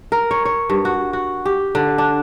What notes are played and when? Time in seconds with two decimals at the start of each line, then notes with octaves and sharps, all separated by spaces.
0.12 A#4
0.31 C#5
0.45 C#5
0.70 G2
0.85 F#4
1.13 F#4
1.46 G4
1.75 D3
1.98 D4